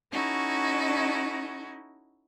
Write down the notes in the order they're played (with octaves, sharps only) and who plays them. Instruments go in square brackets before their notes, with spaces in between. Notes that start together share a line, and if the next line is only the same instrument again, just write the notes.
[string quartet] C#4 D#4 E4 F#4 A4